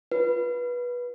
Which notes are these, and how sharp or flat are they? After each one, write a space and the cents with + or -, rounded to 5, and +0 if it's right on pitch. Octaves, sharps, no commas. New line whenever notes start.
F4 +5 B4 -20